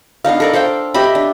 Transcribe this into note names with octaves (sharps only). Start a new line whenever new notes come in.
B3 D4 D#4 F5
A4 A#4 D5
A4 C5 F5 G5
G4 D#5 E5 B5
D4